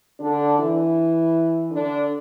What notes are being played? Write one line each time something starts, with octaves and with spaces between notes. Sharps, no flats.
D3 D4
E3 E4
D3 D4